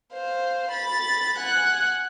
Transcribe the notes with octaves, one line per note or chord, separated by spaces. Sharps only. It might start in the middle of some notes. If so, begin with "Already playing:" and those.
C5 F5
B5 A6
F#5 G#5 F#6